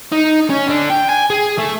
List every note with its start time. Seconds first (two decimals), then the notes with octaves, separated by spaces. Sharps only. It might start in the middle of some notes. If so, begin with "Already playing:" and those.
0.12 D#4
0.49 C#4
0.69 D3
0.90 G5
1.09 G#5
1.30 G#4
1.58 A3